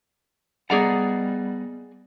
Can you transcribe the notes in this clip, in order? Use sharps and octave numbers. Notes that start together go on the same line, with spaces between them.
G3 B3 G#4 D5 D#5 F#5 A#5